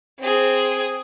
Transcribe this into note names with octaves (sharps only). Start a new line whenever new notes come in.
C4 G#4